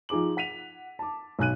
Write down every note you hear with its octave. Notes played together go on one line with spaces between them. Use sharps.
F3 D#4 G#4 D6 F#7
F#5 B6 D#7 F7
A5 D6
B1 G#5 F#6 D#7